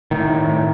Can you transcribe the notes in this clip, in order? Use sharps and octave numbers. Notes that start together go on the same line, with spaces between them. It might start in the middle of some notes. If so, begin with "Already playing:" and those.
A2 D#3
A2
A2